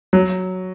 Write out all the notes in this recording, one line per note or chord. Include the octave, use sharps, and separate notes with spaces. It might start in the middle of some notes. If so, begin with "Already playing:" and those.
F#3